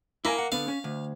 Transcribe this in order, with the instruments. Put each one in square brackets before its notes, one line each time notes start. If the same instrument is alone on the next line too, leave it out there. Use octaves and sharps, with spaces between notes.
[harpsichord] A#3 [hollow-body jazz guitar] E4 A#4 G#5
[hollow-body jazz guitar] F#5
[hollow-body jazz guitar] D3 B3 [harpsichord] F5
[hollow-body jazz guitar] C#4
D2